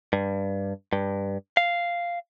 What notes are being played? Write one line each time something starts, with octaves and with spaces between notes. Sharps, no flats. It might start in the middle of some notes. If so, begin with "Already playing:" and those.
G2
G2
F5